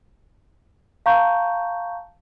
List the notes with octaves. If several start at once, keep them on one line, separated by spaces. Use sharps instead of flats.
F5 A5 A#5 C#6 G6